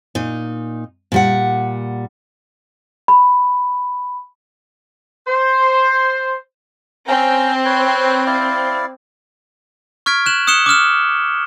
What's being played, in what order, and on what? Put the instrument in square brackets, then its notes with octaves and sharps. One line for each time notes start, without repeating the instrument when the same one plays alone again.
[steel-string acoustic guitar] A#2 D#4
A#2 G3 F#5
[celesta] B5
[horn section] C5
[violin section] C4 [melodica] C#4 G5 A#5
[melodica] B4 C#5
E4 D5 F5
[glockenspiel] C#6 F6 G#6 B6 D7
F#6 E7 F#7
D#6 F#6 C#7 E7 G7
D6 D#6 F6 E7